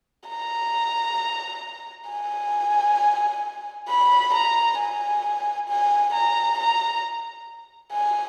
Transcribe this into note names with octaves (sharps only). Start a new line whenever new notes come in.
A#5
G#5
B5
A#5
G#5
G#5
A#5
A#5
G#5